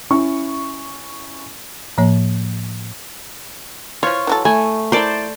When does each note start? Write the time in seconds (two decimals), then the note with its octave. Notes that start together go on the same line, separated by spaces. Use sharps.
0.10 C#4 E4 C#6
1.98 A2 F3 A#3 C#5
4.03 E3 F3 F4 C#5
4.27 E3 F#3 A4
4.45 A3 E4 G#5
4.92 E4 A#4 C5 D5 A5